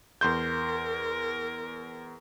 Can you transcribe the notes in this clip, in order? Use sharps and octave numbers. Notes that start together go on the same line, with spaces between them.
E2 A#4 C6 G6